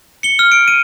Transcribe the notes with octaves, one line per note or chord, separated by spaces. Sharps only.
C#7 G7
F6
D7
D#7